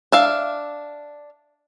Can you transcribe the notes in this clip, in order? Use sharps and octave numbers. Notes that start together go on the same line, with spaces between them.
D4 E5 F5